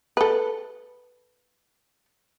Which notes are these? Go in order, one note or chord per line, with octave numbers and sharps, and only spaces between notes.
A4 B4